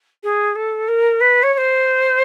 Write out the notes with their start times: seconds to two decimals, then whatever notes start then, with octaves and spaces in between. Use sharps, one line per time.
0.23 G#4
0.55 A4
0.88 A#4
1.20 B4
1.43 C#5
1.53 C#5
1.57 C5